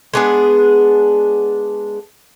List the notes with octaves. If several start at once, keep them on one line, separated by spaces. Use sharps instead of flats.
G#3 B3 D4 G#4